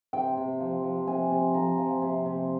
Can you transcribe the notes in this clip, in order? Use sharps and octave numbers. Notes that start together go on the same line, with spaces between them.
C3 G5
C3
F3
F3
C3 G#5
C3
F3 A#5
F3
C3
C3